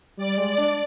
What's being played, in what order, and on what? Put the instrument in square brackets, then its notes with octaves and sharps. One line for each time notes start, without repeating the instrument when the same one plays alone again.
[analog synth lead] G3 [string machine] D5
[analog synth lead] G#3
[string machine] D5
[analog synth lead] D4